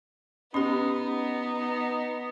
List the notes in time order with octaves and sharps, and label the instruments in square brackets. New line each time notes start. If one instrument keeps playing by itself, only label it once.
[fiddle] B3 [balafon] C#4 G4 [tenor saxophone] D#4